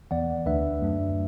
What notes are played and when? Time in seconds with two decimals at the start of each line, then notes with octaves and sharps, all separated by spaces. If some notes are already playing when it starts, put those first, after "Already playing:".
0.11 E2 E3 B3 D5 F#5
0.46 D2 D3 A3 D4 B4 E5
0.82 F#2 F#3 A3 D4